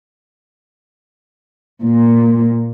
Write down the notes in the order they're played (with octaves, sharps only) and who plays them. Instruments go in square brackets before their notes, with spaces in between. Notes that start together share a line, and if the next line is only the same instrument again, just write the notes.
[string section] A#2